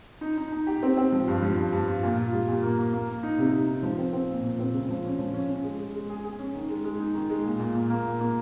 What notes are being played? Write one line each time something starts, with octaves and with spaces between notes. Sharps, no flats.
D#4
D#4
D#4
G4
C4
C4
F3
G2
F3
G2
G2
F4
A#2
F4
G3
A#2
A#3
A#3
A#3
A#3
D#4
C3
D#4
D#4
F3
C4
C4
A#2
A#2
C4
C#3
F3
C#4
F3
C#4
C#4
G#3
G#3
G#3
G#4
G#4
C#4
D#3
G#3
G#3
D#4
D#3
G#3
A#2
A#2
A#2
A#3
A#2
A#3